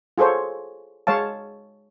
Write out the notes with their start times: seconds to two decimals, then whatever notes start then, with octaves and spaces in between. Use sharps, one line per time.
0.18 F4 G#4 A4 C5 C#5
1.07 G#3 C#5 F5 A5